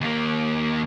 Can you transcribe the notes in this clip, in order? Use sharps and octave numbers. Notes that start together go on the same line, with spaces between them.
D#2 A#3